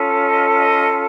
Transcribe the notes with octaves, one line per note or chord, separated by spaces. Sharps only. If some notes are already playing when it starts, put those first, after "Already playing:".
Already playing: C#4 F4 A4
D#5
D#5